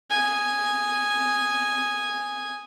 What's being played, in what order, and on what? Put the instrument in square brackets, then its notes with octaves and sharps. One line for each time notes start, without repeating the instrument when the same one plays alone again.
[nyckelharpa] G#5 D#6